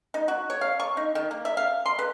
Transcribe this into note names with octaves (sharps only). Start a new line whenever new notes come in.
D#4
F#4
C#5
F5
C#6
D#4
D#3
A#3
E5
F5
C6
B4